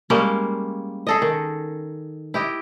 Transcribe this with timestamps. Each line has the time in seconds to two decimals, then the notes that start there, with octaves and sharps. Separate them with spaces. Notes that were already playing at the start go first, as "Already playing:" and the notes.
0.10 G3 G#3 A#3 C#4
1.07 G#4 A4 D#5
1.22 D#3
2.34 E4 G4 D#5